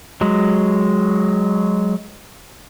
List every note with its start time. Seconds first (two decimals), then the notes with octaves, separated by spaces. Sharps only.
0.21 F#3 G#3